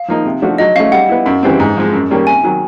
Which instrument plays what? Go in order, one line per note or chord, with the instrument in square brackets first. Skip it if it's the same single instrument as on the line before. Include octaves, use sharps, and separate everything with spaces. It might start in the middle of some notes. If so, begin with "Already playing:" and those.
Already playing: [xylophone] F5
[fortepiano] F3 A#3 D#4
C3
F3 A3 D4 F#4
[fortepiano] F#3 [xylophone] D#5
[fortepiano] A3 C#4 [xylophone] F5
[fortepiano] G3 [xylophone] F#5
[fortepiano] B3 E4
F#2
C#3 E3 G3 C4
G#2
F3 G#3
F#2
D#3 G3 A#3 C#4
[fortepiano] C3 [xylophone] G#5
[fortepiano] D#3 F#3